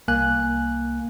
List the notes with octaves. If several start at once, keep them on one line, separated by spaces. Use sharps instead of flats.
C2 A#3 G#5 F#6